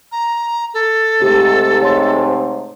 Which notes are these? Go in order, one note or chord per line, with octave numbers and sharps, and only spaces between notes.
A#5
A4
G#2 C3 A3 G4
C#5 C6